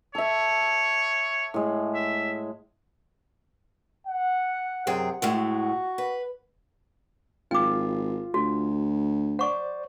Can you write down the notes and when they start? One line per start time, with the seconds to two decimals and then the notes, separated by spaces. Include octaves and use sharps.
0.15 A4 C#5 E5
1.54 A2 G#3
1.94 E5
4.07 F#5
4.87 F#2 C3 G#4 F#5 G5
5.22 A2 G#3 A3 F#4
5.98 B4
7.51 G#1 F4 G5 D6
8.34 D2 F#4
9.39 C5 D5 F#5 C#6